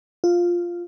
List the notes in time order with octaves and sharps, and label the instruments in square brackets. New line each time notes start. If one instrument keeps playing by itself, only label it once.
[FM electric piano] F4